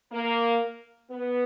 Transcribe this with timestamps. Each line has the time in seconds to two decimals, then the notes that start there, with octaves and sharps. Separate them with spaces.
0.12 A#3
1.11 B3